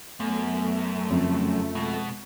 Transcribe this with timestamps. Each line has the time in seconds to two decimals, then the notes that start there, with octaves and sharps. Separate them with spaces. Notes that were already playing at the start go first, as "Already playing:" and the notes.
0.20 F#2 A3 B3
1.10 F2 C#3
1.75 B2 G#3